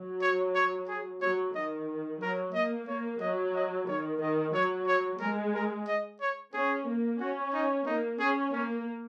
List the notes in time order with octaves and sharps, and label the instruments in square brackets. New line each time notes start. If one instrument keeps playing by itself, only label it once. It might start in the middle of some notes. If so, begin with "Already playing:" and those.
Already playing: [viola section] F#3
[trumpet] C#5
C#5
G#4
[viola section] F#3 [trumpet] C#5
[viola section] D#3 [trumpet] D#5
[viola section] F#3 [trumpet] A#4
[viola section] A#3 [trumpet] D#5
[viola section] A#3 [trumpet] C#5
[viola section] F#3 [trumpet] D#5
[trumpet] D#5
[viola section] D#3 [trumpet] C#5
[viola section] D#3 [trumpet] D#5
[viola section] F#3 [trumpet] C#5
[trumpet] C#5
[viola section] G#3 [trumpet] A#4
[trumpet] A#4
D#5
C#5
[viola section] C#4 [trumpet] G#4
[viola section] A#3
[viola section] C#4 [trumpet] F#4
[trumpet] D#4
[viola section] A#3 [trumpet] D#4
[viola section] C#4 [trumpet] G#4
[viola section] A#3 [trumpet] C#4